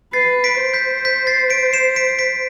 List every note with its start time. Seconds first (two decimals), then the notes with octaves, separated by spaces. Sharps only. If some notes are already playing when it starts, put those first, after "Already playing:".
0.13 B4 A6 C7
0.44 B6 D7
0.59 C5
0.74 G6 B6
1.05 G6 B6
1.27 A6 C7
1.50 B6 D7
1.73 C7 E7
1.96 B6 D7
2.19 B6 D7